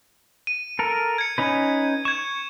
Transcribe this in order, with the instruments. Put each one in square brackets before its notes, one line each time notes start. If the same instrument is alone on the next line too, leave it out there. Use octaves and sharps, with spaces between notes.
[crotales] D#7
[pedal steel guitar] A4 A#4
[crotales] G#6 C#7
[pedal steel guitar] C#4 D#4 B4
[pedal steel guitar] C#6 [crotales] G#6 E7